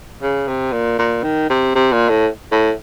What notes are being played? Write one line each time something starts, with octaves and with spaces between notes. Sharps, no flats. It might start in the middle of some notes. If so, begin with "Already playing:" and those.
C#3
C3
A#2
A#2
D#3
C3
C3
A#2
A2
A2